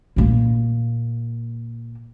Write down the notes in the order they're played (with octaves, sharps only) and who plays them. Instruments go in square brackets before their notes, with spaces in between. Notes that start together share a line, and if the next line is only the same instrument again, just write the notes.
[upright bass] A#2 A#3